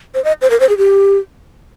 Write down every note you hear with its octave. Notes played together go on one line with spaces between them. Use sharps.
C5
D#5
C5
A#4
C5
G#4
G4